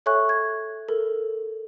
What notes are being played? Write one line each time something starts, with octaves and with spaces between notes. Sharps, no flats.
A4 C#5 E5 G#5 C#6 F#6
G#6
A4 A#4